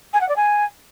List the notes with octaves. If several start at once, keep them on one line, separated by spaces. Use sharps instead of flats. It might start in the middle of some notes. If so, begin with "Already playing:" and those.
G#5
F#5
D5
G#5